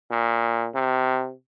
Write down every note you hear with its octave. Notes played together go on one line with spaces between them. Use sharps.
A#2
C3